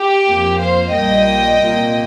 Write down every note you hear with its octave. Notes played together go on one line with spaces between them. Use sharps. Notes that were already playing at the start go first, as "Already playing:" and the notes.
Already playing: G4
F2 F3 A#3
C5 F5
A#1 A#2 G3 A#3 D#5 G5
C2 A#2 A#3